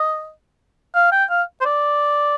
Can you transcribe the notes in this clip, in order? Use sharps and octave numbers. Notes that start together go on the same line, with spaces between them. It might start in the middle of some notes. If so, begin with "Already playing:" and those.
Already playing: D#5
F5
G5
F5
C5
D5